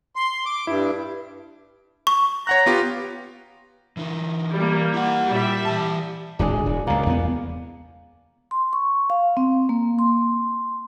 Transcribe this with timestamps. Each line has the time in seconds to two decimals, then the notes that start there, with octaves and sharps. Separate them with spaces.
0.16 C6
0.46 D6
0.67 G2 E4
2.07 C#6
2.47 C#5 F#5 A#5 F#6
2.66 B3 F4 G4
3.97 E3 D#4
4.55 G3 A#3
4.94 E4 F#5
5.31 A#2 G3 E5
5.65 E3 A5
6.39 D1 G#1 G#3 D4 G#4
6.66 E1
6.87 C#2 B2 A#3
7.06 E2 A3 B3
8.51 C6
8.73 C#6
9.10 F5
9.37 C4
9.69 A#3
9.99 C6